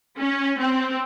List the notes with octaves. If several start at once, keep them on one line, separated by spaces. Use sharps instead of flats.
C#4
C4